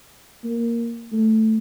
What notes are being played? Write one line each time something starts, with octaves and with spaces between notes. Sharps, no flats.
A#3
A3